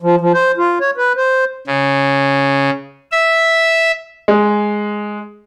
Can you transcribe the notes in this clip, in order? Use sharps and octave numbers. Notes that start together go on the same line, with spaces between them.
F3
F3
C5
F4
C#5
B4
C5
C#3
E5
G#3